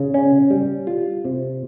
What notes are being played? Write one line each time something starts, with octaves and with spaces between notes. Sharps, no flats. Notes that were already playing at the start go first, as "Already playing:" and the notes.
Already playing: C#3
C#4
G3
F4
C3